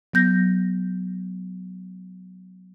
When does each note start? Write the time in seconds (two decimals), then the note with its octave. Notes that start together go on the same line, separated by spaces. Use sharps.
0.13 F#3 B3 G6 A#6